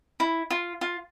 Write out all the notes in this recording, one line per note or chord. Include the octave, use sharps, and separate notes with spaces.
E4
F4
F4